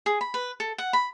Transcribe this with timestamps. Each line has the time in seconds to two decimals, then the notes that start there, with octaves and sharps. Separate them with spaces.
0.06 G#4
0.21 B5
0.34 B4
0.60 A4
0.78 F#5
0.93 B5